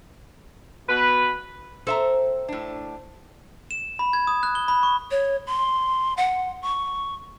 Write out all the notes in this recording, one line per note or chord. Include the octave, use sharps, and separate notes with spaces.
B2 B4
C4 A4 E5 A#5
A2 D4
E7
B5
G#6
D#6
F#6
G7
B5
C#6
C#5
C6
F#5
C#6